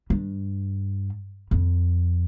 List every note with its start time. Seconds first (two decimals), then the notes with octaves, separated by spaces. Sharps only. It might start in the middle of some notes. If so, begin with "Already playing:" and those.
0.10 G2
1.51 F2